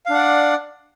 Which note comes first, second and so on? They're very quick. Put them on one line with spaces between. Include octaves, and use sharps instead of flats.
F5 D4 F#5 D5